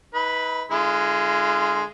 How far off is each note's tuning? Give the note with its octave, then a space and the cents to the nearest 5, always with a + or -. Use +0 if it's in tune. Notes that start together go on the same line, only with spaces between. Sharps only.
D#4 +40 B4 +0
D3 +20 G#3 +5 F4 -35